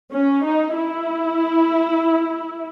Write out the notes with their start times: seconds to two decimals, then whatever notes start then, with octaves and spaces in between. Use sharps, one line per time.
0.12 C#4
0.43 D#4
0.75 E4